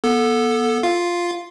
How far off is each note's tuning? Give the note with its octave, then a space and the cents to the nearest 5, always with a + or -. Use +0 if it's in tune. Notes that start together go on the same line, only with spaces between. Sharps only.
B3 -30 A4 +0
F4 +0 F5 +0